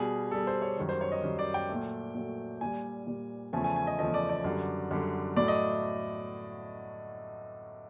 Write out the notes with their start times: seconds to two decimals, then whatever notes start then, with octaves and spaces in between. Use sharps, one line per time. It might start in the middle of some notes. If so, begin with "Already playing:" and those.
Already playing: B2 G3 G#4
0.31 B2 G3 A4
0.47 C5
0.62 C#5
0.77 F#2 D#3 G3
0.89 C5
1.01 C#5
1.12 D#5
1.24 F#2 D#3 G3
1.39 D5
1.54 G5
1.69 A#2 F#3 A3
2.15 A#2 F#3 A3
2.61 A#2 G3 G#5
3.07 A#2 G3
3.53 E2 C#3 F3 A3 G#5
3.64 G#5
3.76 G#5
3.87 D#5
3.99 E2 C#3 F3 A3 D#5
4.14 D5
4.29 D5
4.44 F#2 D3 G3
4.91 F#2 D3 G3
5.37 A2 F#3 A3 D5
5.48 D#5